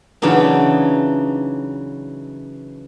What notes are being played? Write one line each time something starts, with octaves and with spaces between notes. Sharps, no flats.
C#3 E3 F#3 D4 D#4